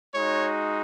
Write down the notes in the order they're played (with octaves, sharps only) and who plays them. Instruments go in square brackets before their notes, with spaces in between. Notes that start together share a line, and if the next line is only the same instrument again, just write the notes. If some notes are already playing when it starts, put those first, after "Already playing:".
[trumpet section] G#3 D#4 F#4 C#5